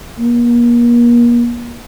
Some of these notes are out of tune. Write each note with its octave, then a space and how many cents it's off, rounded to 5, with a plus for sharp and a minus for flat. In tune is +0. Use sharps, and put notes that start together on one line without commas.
A#3 +40